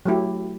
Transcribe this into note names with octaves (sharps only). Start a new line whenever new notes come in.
F#3 A3 E4 G4